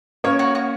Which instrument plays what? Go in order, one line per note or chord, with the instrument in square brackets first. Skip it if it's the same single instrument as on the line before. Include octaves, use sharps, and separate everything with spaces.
[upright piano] A#3 C#4 [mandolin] C#5
[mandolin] F#4
F#4